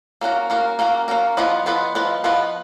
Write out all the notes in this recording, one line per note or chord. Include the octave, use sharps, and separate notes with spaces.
A#3 C#4 F#4 A#4
A#3 C#4 F#4 A#4
A#3 C#4 F#4 A#4
A#3 C#4 F#4 A#4
F3 B3 F4 B4 D#5
F3 B3 F4 B4 D#5
F3 B3 F4 B4 D#5
F3 B3 F4 B4 D#5